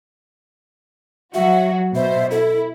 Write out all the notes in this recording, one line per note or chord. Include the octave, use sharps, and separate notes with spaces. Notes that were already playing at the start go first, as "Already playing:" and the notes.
F#3 F#4 E5
B2 C5 E5
E4 A4